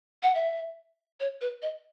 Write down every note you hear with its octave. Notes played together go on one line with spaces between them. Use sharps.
F#5
E5
C#5
B4
D#5